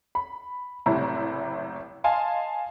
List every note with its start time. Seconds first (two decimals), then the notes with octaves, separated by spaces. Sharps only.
0.15 B5
0.86 F#1 A2 C3 G3 E4 A#5
2.04 D#5 F5 G#5 A5 C6